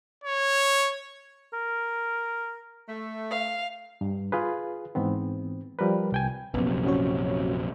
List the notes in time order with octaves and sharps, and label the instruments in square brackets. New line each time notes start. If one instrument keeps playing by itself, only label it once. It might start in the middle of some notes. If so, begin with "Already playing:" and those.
[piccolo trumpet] C#5
[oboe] A#4
[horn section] A3
[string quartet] F5
[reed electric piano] G2
F4 G#4 B4
G#2 E3 B3 C4
F3 G3 A#4 B4
C2 G5 G#5
[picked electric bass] A#1 F#2 C3 [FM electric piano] B3
[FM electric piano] C#4 F#4 C#5